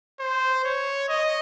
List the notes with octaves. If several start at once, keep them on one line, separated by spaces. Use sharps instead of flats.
C5
C#5
D#5